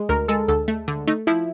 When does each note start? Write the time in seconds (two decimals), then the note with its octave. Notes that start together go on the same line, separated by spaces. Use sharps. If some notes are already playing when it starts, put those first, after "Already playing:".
Already playing: G#3
0.09 D2 A#4
0.28 G#3 A4
0.48 D2 A4
0.68 A3
0.88 D3
1.07 A3 D#4
1.27 F3 E4